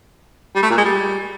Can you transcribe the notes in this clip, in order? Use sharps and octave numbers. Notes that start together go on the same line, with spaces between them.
G3
A3
A#2
G#3
G3